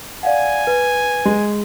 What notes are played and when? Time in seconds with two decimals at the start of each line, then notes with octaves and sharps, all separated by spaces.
0.23 D5 F5 F#5 G#5
0.67 B4
1.25 G#3